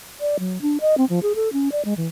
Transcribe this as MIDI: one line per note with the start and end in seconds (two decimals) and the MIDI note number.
0.21 0.37 74
0.40 0.61 54
0.62 0.78 62
0.81 0.98 75
0.98 1.05 60
1.09 1.19 53
1.23 1.33 68
1.35 1.52 69
1.53 1.72 61
1.72 1.85 74
1.85 1.94 56
1.97 2.07 52